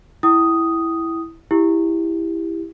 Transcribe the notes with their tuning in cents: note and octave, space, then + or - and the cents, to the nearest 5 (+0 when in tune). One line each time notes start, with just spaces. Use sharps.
E4 +0 G5 -30 D#6 +0
E4 +0 G4 +15